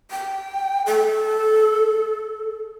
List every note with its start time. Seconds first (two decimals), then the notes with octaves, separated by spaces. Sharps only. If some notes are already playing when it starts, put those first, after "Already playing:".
0.11 G5
0.86 A4